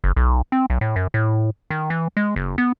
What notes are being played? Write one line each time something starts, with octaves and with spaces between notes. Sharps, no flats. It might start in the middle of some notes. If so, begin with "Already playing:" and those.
F#1
B1
C4
B1
A2
F#2
A2
D#3
E3
G#3
F#1
B3